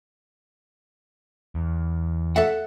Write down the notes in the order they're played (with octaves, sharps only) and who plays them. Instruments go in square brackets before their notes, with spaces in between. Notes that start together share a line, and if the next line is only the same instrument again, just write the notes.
[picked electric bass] E2
[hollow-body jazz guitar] A4 E5 F#5